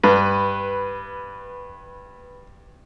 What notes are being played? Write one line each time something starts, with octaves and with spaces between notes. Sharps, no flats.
G2 B4